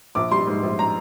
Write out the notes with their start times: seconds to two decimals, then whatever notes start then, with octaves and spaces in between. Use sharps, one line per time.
0.15 A#1 D6
0.31 G3 C6
0.47 G#2
0.63 A#1
0.79 A#5